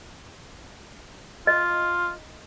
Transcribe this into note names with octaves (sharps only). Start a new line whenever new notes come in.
F4 D#5